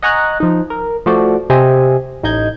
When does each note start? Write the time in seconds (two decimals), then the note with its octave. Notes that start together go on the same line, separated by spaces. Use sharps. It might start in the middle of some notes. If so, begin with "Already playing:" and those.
0.02 D#5 F#5 G#5 A#5 C#6 F#6
0.40 F3 D#4
0.70 A#4
1.06 F3 A3 F#4 C5 D5
1.50 C3 G4 C5 D#5 E5 G#5
2.23 A1 D#4 D#5 G6 G#6